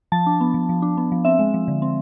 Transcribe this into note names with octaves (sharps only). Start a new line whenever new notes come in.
F3 A5
D4
B3
F3
F3
D4
B3
F3
C4 E5
G#3
F3
D3
C4